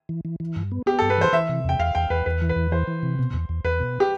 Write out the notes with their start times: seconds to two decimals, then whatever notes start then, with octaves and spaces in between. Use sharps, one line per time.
0.09 E3
0.25 E3
0.40 E3
0.56 G2
0.72 B3
0.86 B3 G4
0.99 G2 A4
1.10 B4
1.18 E3 C5
1.33 E3 E5
1.49 C3
1.64 E2 G5
1.79 E2 F5
1.95 E2 G5
2.10 E2 B4
2.26 E2 B4
2.42 E3
2.49 B4
2.56 E2
2.71 E3 C5
2.87 E3
3.03 C3
3.19 B2
3.33 E2
3.49 E2
3.64 E2 B4
3.80 B2
4.00 G4